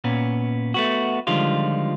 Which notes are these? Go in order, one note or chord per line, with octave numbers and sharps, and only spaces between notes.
A#2 B3 C#4
A3 B3 F#4
D3 D#3 F3 G3 G#3 F4